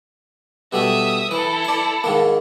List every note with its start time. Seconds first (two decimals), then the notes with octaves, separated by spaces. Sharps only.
0.73 B2 G3 A3 E5 D#6
1.31 E3 E4 A4
1.65 D5 B5
2.04 G#2 D#3 A#3